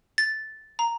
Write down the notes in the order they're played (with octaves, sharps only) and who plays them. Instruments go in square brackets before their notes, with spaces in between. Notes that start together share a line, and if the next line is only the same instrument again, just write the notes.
[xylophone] A6
A#5